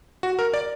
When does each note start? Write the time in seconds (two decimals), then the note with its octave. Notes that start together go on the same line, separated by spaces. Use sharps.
0.23 F#4
0.39 A#4
0.54 D5